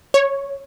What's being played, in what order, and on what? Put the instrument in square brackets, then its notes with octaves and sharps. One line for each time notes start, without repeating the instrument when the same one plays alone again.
[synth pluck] C#5